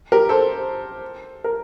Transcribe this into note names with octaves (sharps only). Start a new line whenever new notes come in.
G4 A#4
A4 C5
A#4